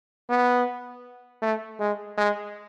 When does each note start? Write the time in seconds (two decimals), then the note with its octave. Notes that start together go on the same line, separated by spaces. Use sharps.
0.29 B3
1.42 A3
1.80 G#3
2.18 G#3